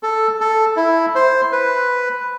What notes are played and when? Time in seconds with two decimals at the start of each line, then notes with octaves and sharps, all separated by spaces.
0.03 A4
0.40 A4
0.77 E4
1.15 C5
1.52 B4